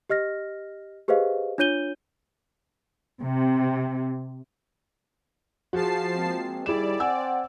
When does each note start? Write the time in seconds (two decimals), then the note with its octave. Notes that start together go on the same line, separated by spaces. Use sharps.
0.10 G4 D#5 F6 A#6
1.08 G4 G#4 B4 C5 D#5 F5
1.58 D4 F4 C#5 G6 D#7 G7
3.21 C3
5.73 F3 F#4 G#4 A5 C7
6.15 G#3 A#3 C4
6.66 D#2 G3 E4 G#4 D5 E7
7.00 C4 F#5 G#5 E6